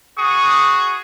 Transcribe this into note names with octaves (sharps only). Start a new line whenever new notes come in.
F#4 G#4 C#6 D#6